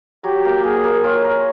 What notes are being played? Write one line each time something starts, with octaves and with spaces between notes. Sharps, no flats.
F#3 G4
A#3
A#3 G#4
A#3
F4 C#5
A#4